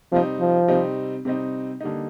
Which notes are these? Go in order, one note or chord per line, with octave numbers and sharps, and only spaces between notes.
C3 F3 G3 C4 D#4
F3
C3 G3 C4 D#4
C3 G3 C4 D#4
D3 G3 A#3 D#4